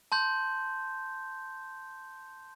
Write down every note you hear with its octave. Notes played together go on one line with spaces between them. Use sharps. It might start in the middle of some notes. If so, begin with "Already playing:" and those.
A5 C6 G6